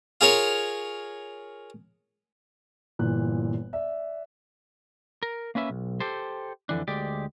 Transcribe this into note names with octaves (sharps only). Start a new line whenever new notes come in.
F4 G#4 A#4 C#5
G1 A#2 E3 F#6
D5 E5
A#4
A#3 C#4 B4 E5
B1
G4 A4 C5
F2 D3 E3 D4
D2 G#3 G4 D5